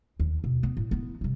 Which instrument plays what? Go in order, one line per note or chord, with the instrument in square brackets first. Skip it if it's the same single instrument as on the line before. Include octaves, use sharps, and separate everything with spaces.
[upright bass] D#2
B2
B3
A2
B3 E4
C3 G3